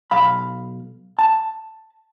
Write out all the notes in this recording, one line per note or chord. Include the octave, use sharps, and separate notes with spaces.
B1 F5 B5
A5